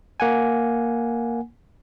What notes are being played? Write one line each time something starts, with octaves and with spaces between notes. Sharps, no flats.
A#3 F#5 G#5